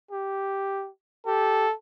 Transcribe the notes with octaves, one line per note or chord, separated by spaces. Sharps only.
G4
G4 A4